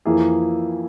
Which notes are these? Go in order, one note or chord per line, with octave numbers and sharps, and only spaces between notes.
F2 E3 A#3 E4 G#4